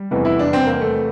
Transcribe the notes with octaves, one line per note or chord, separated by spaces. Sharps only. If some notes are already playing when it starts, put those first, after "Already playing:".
Already playing: G3
F1 E2 E3
E4
D4
C4
A#3
A3